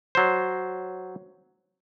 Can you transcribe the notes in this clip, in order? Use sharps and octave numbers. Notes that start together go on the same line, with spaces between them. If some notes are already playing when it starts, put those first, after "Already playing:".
F#3 C5